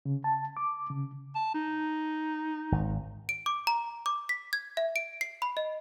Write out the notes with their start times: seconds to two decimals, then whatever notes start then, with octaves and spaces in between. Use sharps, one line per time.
0.05 C#3
0.24 A5
0.57 D6
0.90 C#3
1.35 A5
1.54 D#4
2.72 G#1
3.29 D7
3.46 D6
3.67 A#5
4.06 D6
4.29 B6
4.53 G#6
4.77 E5
4.96 D7
5.21 C7
5.42 B5
5.57 D#5